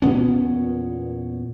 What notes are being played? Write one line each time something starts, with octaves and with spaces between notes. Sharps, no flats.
E2 A#2 B3 C#4